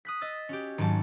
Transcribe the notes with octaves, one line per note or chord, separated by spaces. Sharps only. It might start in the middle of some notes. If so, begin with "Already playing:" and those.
D#6 F#6 B6
D#5 E6 A6
C#4 F#4 G4
G#1 G#2 F#3 A5